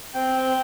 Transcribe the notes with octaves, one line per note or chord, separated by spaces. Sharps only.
C4 G5